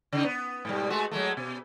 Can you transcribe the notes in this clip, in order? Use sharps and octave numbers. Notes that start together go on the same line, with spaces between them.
C#3 D#4
B3
G#2 B2 G3
G#3 A3 F#4
F#3 G#3 A3
B2